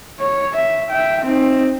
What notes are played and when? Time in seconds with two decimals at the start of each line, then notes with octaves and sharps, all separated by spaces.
0.20 C#5
0.55 E5
0.90 E5 G5
1.24 C4 D#4